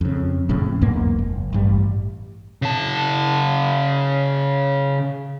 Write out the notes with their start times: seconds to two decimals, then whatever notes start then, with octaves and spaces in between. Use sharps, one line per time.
0.01 F2 C#3
0.49 F#1 F2 A2 C#3
0.81 B1 E2 G#2 A#3
1.18 F#1
1.53 A1 G2 G3
2.62 C#3 A5